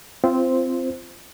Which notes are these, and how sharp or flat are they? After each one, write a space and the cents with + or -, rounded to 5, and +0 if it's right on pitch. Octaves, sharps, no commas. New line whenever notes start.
C4 -10 F4 -25 C5 +0